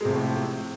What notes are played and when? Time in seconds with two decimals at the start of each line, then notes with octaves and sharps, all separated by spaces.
0.01 G#3
0.05 C3
0.09 F3
0.14 A2